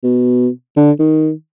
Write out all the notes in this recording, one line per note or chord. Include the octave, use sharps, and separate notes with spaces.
B2
D3
D#3